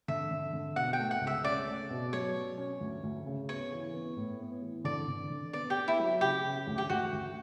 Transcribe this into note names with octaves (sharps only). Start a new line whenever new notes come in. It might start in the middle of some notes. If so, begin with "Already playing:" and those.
D3 E5
D3
D3
B2 F#5
G5
A3
F#5
C#2
E5
C#4 D5
A3
B2
F#3 C#5
F#3
C#4
D2
D2
C#3
B3 C#5
E3
B3
A2
B3
E3
D3 D5
D3
D3
B3 D5
G4
B3
E4
F#3
C#3 G4
C#3
D2
G4
D2 F#4
D2